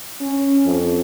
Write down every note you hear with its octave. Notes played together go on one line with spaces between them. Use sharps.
C#4
F2